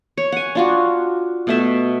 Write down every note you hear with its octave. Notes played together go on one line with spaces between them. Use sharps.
C#5
F#5 G#5
D4 F4 F#4
B2 A3 E5